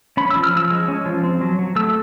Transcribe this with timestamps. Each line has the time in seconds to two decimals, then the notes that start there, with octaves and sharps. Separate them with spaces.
0.17 C#4 B5
0.30 E6
0.35 F3
0.44 F6
0.53 F3 E6
0.71 G#3
0.88 C#4
1.06 F3
1.24 C4
1.41 F#3
1.59 F#3
1.76 A3 E6